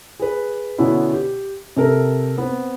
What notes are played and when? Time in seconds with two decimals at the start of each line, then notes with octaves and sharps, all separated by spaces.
0.20 G#4 B4
0.78 B2 D3 B3 C#4 E4
1.13 G4
1.76 C3 A4 A#4
2.38 B3 C4